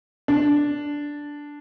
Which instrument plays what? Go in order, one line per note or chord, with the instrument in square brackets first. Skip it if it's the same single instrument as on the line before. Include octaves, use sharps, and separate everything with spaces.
[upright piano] D4